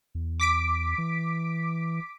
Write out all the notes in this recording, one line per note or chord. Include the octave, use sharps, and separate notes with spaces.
E2
D6 B6 D7
E3